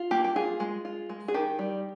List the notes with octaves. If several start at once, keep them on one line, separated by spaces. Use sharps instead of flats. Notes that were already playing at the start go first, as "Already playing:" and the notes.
Already playing: F4
A#3 G4
G4
F4 G#4
G#3
F4
G#3
G#4
D#3 G4
G3